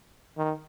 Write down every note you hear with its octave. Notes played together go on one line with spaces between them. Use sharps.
D#3